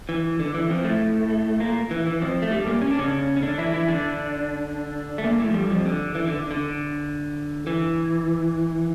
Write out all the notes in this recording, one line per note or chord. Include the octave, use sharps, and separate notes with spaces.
E3
D3
E3
F2 F3
A2 A3
A#2 A#3
E3
E3
F2 F3
A3
G2 G3
A#2 A#3
C#4
D4
C#3 C#4
C#4
D3 D4
E3 E4
E3 E4
D3 D4
A3
A#2 A#3
A2 A3
F3
G2 G3
F2 F3
D3
E3
D3
D3
E3